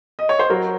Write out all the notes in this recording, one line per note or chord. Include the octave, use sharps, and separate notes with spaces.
D#5
C#5
C5
F#3 F#4 A#4